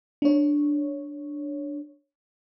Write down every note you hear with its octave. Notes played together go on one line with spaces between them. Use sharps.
D4 C#5